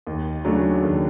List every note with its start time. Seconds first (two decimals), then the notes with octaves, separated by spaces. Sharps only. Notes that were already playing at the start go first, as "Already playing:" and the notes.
0.07 D#2
0.45 C#3 F#3 A3 D4
0.83 D#2